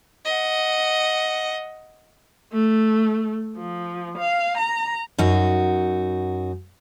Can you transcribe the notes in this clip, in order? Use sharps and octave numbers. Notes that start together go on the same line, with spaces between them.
D#5 F#5
A3
F3
F5
A#5
F#2 D#4 F#4